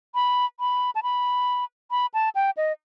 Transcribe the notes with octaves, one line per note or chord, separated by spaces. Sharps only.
B5
B5
A5
B5
B5
A5
G5
D#5